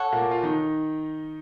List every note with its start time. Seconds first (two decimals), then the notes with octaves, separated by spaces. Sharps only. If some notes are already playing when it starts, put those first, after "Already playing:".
Already playing: A4 C#5 F#5
0.12 A#2 A#3
0.31 F4
0.43 D#3 D#4